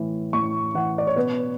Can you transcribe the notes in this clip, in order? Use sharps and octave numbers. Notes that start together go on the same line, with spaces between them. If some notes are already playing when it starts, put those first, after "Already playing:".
Already playing: A2 E3
A2 C#6
E3 F#5
D5
C#5
B2 B4